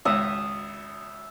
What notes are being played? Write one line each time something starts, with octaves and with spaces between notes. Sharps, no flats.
G#1 C#2 E5 D#6